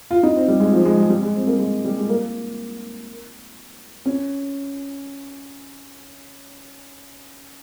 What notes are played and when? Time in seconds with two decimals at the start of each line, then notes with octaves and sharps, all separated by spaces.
0.11 F4
0.23 D#4
0.36 C4
0.48 G3
0.60 G#3
0.73 F3
0.85 G#3
0.97 G#3
1.10 G3
1.23 G#3
1.35 C4
1.47 A#3
1.59 G#3
1.85 G3
1.97 G#3
2.09 A#3
4.06 C#4